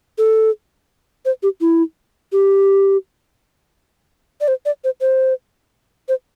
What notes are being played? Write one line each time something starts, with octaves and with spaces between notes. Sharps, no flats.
A4
C5
G4
E4
G4
D5
C5
D5
C5
C5
C5